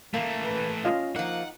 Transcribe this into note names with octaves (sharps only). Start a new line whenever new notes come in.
E3 A3 A#3
B4
C#4 F4 D#5 F5
F3 A#3 D#4 F#5